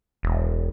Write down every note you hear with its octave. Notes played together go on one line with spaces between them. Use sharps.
E1